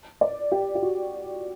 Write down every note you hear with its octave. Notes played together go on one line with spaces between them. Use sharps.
D5
G4
G4
F#4